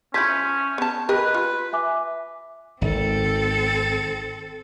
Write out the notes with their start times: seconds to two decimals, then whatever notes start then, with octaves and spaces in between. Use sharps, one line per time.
0.14 F3 C#4 E4 G6 G#6 B6
0.78 B3 A5
1.09 G4 A#4 B4 D#5
1.34 F4
1.73 E5 G#5 D6
2.82 G#1 C4 A4